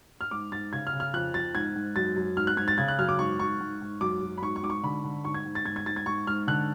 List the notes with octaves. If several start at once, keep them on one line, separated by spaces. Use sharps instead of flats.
F6
G#2 D6
G#2 A6
C#3 G#6
F6
C#3
F6
F2 F#6
F2 A6
G#2 G#6
G#2
F#2 A6
F#2
G#2 F6
F#6
G#2 G#6
A6
C#3 G#6
F#6
F#2 F6
D6
G#2 C#6
G#2 C#6
G#2
G#2
F#2 D6
F#2
B5
G#2 C#6
C#6
G#2 D6
C#6
D3 B5
D3
G#2 C#6
G#6
G#2
A6
G#2 G#6
G#6
G#2 A6
G#6
G#2 C#6
G#2 F6
D3 F#6